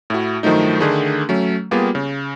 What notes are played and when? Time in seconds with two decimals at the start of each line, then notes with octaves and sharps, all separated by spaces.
0.10 A2 E4 F#4
0.43 G2 D#3 F3 F#3 A3 D#4
0.80 D3 D#3 A3 D4 G#4
1.29 F#3 A3 C#4
1.71 G3 A#3 B3 F4 G4 G#4
1.95 C#3